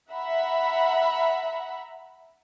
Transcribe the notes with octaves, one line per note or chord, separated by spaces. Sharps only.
E5 F#5 A#5 B5